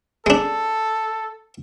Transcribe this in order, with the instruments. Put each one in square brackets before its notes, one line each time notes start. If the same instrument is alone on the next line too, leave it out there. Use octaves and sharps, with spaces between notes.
[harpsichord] G#3 D4 [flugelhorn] A4